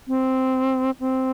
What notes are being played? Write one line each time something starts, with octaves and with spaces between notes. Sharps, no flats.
C4
C4